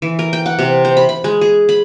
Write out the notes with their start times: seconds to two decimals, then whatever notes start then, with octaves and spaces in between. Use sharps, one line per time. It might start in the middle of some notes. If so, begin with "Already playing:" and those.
0.02 E3
0.19 A#4
0.33 G5
0.46 F#5
0.59 C3
0.85 C5
0.97 B5
1.09 B5
1.24 G#3
1.41 G#4
1.69 B5